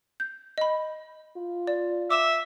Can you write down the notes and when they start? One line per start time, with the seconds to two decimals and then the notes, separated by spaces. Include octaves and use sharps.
0.20 G6
0.58 D#5 B5
1.37 F4
1.67 D5
2.11 E5 D6 E6 E7